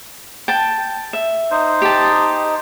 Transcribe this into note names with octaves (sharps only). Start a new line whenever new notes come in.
G5 A5
E5
D#4 C5
G4 A5